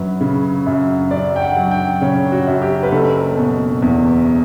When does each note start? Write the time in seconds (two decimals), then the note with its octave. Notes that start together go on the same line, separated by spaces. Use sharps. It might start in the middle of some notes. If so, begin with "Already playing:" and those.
Already playing: F#2 F#3 B4
0.21 C#3
0.66 F#2
1.11 F#2 D5
1.36 G5
1.42 F#5
1.57 F#3
1.71 G5
2.01 C#3 C#5
2.32 F#4
2.47 F#2
2.62 G4
2.83 B4
2.92 F#1 A4
3.37 B2
3.82 E2